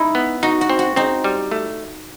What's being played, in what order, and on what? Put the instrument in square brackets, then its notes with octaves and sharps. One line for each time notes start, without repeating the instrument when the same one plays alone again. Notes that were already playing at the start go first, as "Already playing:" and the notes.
Already playing: [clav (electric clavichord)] D#4 [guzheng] E4
[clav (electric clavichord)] B3
[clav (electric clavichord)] D#4 [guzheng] F#4
[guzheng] F#4
[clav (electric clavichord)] C4
[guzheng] F#4
[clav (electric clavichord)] C4 [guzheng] D#4
[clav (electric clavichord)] G3
A3